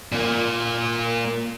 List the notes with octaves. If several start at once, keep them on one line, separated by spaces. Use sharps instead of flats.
A#2 A#3